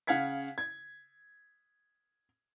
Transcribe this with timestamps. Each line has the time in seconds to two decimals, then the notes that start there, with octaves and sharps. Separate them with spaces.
0.07 C#3 F5 F#5 G#6 B6
0.58 G#6